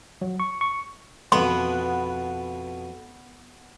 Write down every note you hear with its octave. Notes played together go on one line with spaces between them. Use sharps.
F#3
C#6
C#6
F2 B2 B3 C6